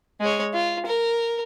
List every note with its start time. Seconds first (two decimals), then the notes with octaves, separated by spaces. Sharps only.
0.21 G#3 C#5
0.53 F4
0.86 A#4